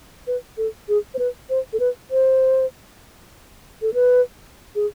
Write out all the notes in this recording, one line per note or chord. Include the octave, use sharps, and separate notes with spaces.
B4
A4
G#4
C5
B4
C5
A4
B4
C5
A4
B4
G#4